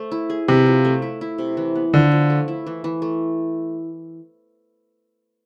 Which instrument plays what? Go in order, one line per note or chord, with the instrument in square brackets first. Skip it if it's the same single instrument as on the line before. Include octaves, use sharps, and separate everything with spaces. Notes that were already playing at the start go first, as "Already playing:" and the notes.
Already playing: [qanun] A3 C5
E4
G#4
[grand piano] C3 [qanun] B4
[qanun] F3
A3
E4
E4
C3
E3
B3
[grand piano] D3 [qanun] F3
[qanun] F3
A3
E4
E3
E3
A3